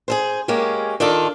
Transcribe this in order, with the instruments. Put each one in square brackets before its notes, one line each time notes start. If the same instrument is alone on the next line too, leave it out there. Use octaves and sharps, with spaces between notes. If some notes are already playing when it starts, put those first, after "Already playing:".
[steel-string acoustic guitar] G#4 A4 C5
G#3 A#3 C#4 G4
D#3 D4 F4 A4